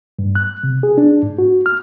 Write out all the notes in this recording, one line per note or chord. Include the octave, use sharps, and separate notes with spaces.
G2
F#6
C3
G#4
D4
G#2
F#4
F6